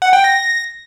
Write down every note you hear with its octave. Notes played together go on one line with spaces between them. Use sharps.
F#5
G5
A#6